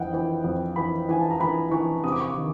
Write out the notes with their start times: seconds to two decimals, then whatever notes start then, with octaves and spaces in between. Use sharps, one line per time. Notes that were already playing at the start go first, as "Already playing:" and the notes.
Already playing: F2 E3 D#5 F#5 G5
0.13 E3
0.44 F2
0.76 E3 B5
1.09 E3 G#5
1.21 A5
1.31 A#5
1.40 E3 B5
1.71 E3 C#6
2.04 C3 D#6
2.12 D6
2.21 C#6
2.28 D6
2.36 D#3